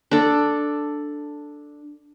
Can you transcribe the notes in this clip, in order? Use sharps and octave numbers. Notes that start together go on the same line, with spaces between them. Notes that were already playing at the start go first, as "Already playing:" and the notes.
D4 A4